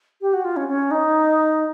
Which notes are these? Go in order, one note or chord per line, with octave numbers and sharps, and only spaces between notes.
G4
F#4
F4
C#4
C#4
D#4